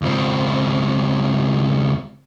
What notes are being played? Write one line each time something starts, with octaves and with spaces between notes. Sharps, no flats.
C#2 C4